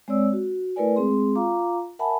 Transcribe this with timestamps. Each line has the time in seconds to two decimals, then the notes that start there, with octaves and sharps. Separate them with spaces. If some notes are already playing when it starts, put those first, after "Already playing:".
0.08 G#3 C4 C#5 D5 E6
0.33 F#4
0.76 A3 E4 A#4 B4 D5 G#5
0.96 G#3 C4 G#4 C6
1.35 F4 F5 A#5 D6
1.99 A#4 E5 F#5 G#5 A5 B5